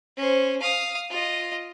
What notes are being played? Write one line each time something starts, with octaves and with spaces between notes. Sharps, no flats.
C#4 C5
F5 D#6
F4 D#5